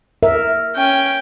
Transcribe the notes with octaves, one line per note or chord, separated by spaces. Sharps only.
A#4 E5
C#4 G5